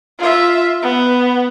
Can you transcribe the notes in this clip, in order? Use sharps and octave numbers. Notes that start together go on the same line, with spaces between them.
F4 E5
B3